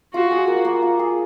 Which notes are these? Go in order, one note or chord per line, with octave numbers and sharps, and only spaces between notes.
F4 F#4
G#4
A#3
A#3
F4
G#4